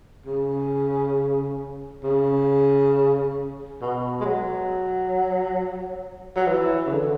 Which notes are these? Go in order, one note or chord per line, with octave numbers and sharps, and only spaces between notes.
C#3
C#3
B2
G#3
F#3
F#3
E3
C#3
D3